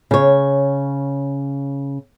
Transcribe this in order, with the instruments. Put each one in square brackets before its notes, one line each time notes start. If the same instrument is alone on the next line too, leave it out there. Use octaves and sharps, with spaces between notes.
[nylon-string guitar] C#3 C#5